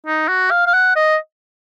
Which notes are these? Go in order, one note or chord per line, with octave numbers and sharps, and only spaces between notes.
D#4
F#4
F5
F5
F#5
D#5